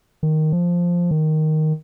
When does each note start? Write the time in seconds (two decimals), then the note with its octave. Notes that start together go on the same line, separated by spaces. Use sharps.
0.23 D#3
0.52 F3
1.11 D#3